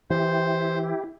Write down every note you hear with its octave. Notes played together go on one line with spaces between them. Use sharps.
E3 E4 G4 C5